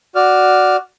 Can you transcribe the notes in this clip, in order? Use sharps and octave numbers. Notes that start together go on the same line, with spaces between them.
F#4 D5 F6